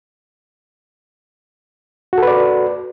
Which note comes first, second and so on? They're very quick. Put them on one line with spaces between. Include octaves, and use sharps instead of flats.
F#4 A4 B4 D5